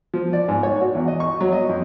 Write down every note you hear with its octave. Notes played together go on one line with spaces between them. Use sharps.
F3
D5
G#2
C#5
F#4
E2
D#5
C#6
F#3
D#5
F2